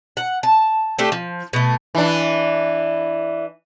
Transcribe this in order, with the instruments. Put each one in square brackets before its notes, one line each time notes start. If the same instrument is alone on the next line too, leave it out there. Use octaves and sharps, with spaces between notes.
[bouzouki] F#5
A5
A3 D4 G4
F3
B2 A3
[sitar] E3 D4